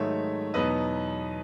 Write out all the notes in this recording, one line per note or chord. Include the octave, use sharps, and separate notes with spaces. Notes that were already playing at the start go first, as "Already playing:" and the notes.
Already playing: G#2 D#3 F#3 A3 C#5 E5
E2 B2 F#3 B3 D#4 B4 D#5